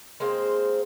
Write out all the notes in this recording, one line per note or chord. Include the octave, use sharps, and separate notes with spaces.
G#3 A#3 C4 C5